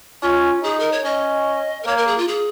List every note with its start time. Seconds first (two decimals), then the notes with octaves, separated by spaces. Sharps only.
0.22 C#4 F4
0.63 D#4 G#4
0.79 A#4
0.92 C#5
1.04 C#4 D#5
1.83 A#4
1.86 A#3 C#5
1.97 A#4
2.07 G#4
2.18 F4
2.28 G#4